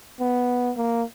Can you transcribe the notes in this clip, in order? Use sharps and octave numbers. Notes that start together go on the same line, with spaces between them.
B3
A#3